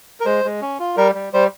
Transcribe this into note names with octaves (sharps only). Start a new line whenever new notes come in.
A#4
G#3 C5
G#3
C#4
F4
G3 A#4
G3
G3 C5